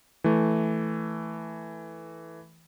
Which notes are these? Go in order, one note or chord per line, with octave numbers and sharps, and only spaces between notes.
E3 A3